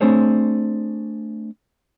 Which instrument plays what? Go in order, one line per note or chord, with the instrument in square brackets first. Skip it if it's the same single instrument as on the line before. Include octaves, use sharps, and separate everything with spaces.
[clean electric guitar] A3 C4 D4 G#4 C5 C#5